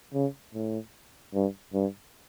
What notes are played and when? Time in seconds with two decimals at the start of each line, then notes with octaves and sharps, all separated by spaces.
0.14 C#3
0.54 A2
1.34 G2
1.74 G2